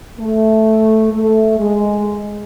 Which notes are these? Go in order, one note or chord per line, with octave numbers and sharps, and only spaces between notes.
A3
A3
G#3